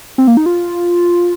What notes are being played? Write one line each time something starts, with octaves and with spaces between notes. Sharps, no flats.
C4
A#3
D#4
F4